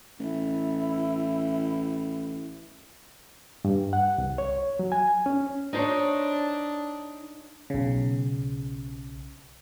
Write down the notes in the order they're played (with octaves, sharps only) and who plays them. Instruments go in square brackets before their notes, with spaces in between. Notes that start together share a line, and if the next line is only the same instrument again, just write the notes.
[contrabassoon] A1 [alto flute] E4
[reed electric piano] G2
F#5
C2
C#5
F#3
G#5
C#4
[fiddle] D4 [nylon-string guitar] D#4 C5 C#5
[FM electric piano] B1 C#3